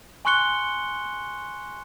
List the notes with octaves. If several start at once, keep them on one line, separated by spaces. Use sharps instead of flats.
G#5 C6 C#6 F#6 C#7 G7